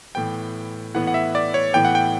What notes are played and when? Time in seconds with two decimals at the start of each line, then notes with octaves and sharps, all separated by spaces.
0.15 A2 E3 B3 G5
0.94 A2 E3 B3 F#5
1.07 F#5
1.14 E5
1.35 D5
1.54 C#5
1.73 A2 E3 B3 G5
1.85 F#5
1.95 G5